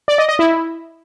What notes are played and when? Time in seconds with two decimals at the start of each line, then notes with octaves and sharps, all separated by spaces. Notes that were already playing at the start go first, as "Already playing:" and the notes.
0.08 D5
0.18 D#5
0.29 D#5
0.39 E4